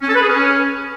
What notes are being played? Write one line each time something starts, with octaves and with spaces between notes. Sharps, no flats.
C#4
A4
B4
G#4
C#4